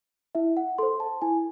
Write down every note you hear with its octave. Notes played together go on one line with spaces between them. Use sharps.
E4 E5
F#5
A4 C5 C6
A5
E4 G#5